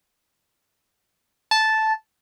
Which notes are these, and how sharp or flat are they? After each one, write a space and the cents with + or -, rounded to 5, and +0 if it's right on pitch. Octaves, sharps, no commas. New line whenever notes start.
A5 -5